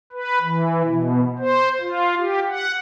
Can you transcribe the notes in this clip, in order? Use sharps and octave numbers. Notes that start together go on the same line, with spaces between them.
B4
E3
B2
C5
F4
G4
F#5